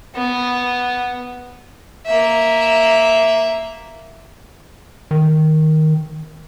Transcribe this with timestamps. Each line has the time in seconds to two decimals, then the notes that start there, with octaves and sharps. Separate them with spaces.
0.15 B3
2.06 A#3 E5
5.11 D#3